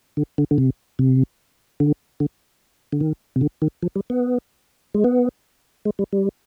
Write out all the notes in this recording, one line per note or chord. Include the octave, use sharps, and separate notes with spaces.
D3
D3
D3
C3
C3
D3
D3
D3
D#3
C3
D3
D#3
F3
G3
B3
G#3
B3
G#3
G3
G3